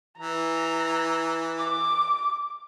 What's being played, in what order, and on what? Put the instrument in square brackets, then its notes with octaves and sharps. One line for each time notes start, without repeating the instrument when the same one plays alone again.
[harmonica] E3 [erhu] A#5
[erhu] D6